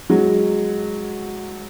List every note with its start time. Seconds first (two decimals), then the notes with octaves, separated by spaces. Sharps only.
0.10 F#3 G#3